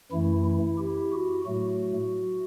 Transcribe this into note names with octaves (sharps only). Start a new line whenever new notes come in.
F#2 E3 A3 E4
E4
E4 G4
F#4
A2 F#3 A3 F#4